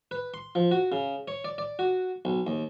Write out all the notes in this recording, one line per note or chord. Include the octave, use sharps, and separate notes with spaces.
B4
C6
F3
F#4
C#3
C#5
D5
D5
F#4
B1
D#2